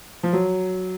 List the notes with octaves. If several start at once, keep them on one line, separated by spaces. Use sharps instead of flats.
F3
F#3